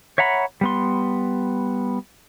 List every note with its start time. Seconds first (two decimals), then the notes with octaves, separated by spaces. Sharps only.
0.18 C#5 E5 F#5 A#5 B5
0.61 G3 B3 C6